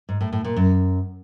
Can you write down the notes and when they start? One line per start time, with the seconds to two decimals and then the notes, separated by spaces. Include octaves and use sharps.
0.09 G#2
0.21 A2
0.33 A2
0.45 A#2
0.56 F#2